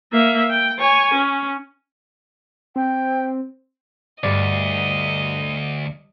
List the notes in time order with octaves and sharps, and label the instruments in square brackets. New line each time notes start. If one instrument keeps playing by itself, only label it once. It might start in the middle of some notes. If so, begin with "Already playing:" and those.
[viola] A#3 E5
G5
C#5 G#5
C#4
[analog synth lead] C4 [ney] G5
[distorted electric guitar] D2 [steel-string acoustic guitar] G2 [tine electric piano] D5 [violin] D#5